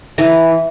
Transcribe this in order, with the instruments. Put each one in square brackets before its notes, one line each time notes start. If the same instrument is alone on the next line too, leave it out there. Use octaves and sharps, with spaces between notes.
[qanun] E3 A#5